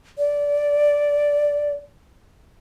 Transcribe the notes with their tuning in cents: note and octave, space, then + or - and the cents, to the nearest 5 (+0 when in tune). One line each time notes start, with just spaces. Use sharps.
D5 -10